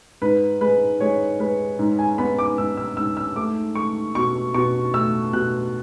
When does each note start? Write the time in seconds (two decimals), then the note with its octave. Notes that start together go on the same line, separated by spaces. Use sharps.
0.22 G#2 B4
0.61 G#3 B4
1.00 G#3 C#5
1.39 G#3 B4
1.79 G#2
1.99 G#5
2.18 B3 B5
2.39 D6
2.58 G#2 E6
2.77 E6
2.97 G#2 E6
3.17 E6
3.36 A3 D6
3.75 A3 C#6
4.15 B2 C#6
4.54 B2 C#6
4.94 A3 E6
5.33 B2 F#6